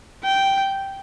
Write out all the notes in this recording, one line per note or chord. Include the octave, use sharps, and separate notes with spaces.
G5